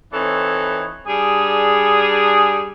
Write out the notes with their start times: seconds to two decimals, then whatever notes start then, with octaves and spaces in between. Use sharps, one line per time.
0.14 E3 C4 D#4 A4 C#5
1.07 G3 D4 G#4